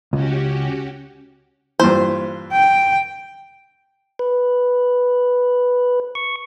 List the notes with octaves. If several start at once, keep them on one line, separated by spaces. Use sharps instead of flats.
C#2 C#4 F#4 G4
G2 A#2 E3 C5
G5
B4
C#6